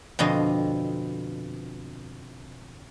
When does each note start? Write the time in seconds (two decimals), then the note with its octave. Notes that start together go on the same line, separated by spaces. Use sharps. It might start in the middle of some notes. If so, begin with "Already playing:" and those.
0.19 F2 B2 D3 C4 D#5